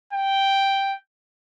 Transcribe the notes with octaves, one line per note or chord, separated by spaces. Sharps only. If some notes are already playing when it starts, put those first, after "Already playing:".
G5